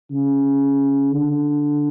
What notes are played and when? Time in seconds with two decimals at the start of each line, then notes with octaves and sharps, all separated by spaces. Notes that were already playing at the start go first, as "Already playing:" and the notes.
0.11 C#3
1.11 D3